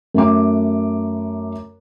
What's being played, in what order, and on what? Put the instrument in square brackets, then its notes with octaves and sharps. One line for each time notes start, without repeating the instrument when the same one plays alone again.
[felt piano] F#2 A3 D6